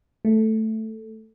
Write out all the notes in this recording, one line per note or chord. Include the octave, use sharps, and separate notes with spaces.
A3